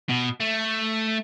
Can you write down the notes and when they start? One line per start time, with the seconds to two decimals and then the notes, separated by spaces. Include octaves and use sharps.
0.09 B2
0.40 A3